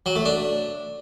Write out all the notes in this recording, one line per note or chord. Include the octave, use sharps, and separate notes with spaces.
F#3
A3
D4